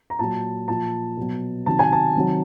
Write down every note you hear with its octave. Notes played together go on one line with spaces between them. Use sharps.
A#5
A#2 F#3 A5
A#2 F3 A5
B2 F#3
C3 D#3 F#3 A5
G#5
A5
C3 D#3 F#3